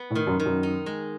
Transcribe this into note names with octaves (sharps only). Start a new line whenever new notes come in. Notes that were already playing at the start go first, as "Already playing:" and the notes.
Already playing: B3
A2
D#3
F#2
D#3
F#2
D#4
G#3